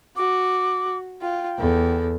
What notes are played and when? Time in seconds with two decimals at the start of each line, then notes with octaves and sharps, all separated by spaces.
0.16 F#4 D6
1.21 F4 G5
1.58 E2 A4